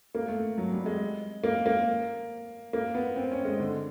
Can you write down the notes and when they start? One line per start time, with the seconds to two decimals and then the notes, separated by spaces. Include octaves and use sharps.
0.15 A#3
0.28 A3
0.58 F#3
0.72 G3
0.86 G#3
1.43 A#3
1.66 A#3
2.73 A#3
2.95 B3
3.16 C4
3.32 C#4
3.45 G#3
3.60 D3